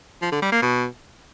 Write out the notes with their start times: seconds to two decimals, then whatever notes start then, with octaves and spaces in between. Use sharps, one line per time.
0.22 F3
0.32 D3
0.42 G3
0.52 A#3
0.62 B2